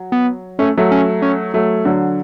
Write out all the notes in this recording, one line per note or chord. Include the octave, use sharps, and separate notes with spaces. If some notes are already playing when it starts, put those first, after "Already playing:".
Already playing: F#3
B3
A3 C#4
F#3 A3
C#4
C#4
F#3 A3
D3 F#3